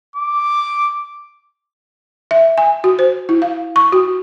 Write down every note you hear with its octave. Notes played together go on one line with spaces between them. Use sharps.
D6
E5
G#5
F#4
C5
E4
F5
C#6
F#4